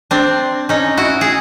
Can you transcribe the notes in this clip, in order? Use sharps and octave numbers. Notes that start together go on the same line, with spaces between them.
C4 D4
C#4 D#4
E4 F#4
G#4